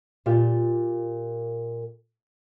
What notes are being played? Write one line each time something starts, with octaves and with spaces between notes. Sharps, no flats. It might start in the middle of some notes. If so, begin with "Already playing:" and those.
A#2 A#3 F4 G4